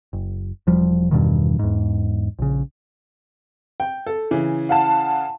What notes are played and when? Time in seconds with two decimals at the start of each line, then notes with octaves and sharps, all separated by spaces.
0.13 F#1
0.67 E1 F3 G3
1.11 E2 G2 B2 D#3
1.59 E2 G#2
2.39 A#1 C#3
3.80 G5
4.06 A4
4.31 C#3 E3
4.69 F5 F#5 A5